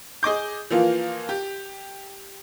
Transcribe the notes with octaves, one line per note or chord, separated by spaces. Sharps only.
G#4 D#5 D6 G6
E3 F3 A#3 F4
G4